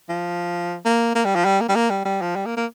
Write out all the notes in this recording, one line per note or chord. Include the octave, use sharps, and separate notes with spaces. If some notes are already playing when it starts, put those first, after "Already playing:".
F3
A#3
A#3
G3
F3
G3
A#3
G3
A#3
G3
G3
F3
G3
A#3
A#3